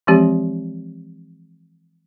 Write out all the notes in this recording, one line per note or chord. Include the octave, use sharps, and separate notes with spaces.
E3 F3 G#3 C4 G4